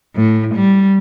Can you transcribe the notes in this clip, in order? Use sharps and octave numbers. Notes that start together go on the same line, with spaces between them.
A2
G3